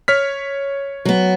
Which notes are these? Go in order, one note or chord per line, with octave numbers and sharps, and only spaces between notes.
C#5 F6 B6
F#3 B3